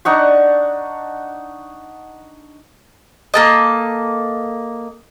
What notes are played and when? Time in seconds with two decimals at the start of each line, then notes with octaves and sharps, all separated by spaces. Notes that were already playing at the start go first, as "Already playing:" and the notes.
0.05 D4 D#4 F#5 C#6
3.34 A#3 A4 D#5